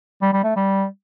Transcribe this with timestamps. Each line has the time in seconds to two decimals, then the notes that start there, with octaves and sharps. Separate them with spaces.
0.22 G3
0.33 G3
0.43 A3
0.56 G3